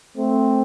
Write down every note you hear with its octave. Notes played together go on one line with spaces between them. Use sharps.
A3 C4